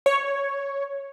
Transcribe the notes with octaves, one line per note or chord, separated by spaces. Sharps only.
C#5